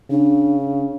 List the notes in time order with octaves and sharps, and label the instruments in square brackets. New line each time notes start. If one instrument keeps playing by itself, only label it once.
[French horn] C#3 [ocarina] D4